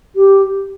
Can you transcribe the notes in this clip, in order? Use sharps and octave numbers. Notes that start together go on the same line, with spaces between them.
G4